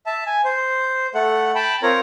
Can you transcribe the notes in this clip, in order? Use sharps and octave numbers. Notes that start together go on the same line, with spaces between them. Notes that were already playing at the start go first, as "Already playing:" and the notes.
E5 A5
G#5
C5
A3 A4 F#5
G5 A5 B5
C4 F4 A#4 C#5 A#5